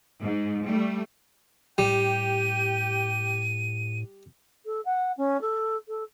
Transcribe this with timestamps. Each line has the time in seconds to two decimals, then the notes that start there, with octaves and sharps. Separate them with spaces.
0.22 G#2
0.66 G3 A3
1.78 A2 G3 G4 G5 D#7
4.66 A4
4.85 F#5
5.17 C#4
5.41 A4
5.88 A4